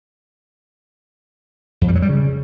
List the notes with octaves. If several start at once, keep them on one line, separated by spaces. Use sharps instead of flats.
F2
G3
F#3
G3
C#3